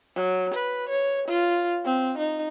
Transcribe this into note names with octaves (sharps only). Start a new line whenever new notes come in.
F#3
B4
C#5
F4
C4
D#4